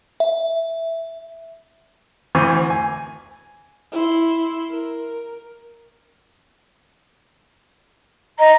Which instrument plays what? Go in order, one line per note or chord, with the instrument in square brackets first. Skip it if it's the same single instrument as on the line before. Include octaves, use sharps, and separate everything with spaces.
[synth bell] E5
[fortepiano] D2 E3 C5 C#6
G#5
[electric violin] E4 C6
A#4
[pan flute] D#5 [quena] A#5